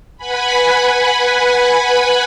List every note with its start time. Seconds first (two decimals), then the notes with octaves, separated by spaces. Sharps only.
0.17 B4 F#5 G#5 B5